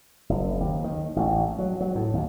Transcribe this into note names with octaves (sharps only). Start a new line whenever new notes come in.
F#1
D#2
D#3
A1
F#3
F#3
A2
D#2